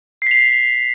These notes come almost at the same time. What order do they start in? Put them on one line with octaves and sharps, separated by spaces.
C7 B6 F7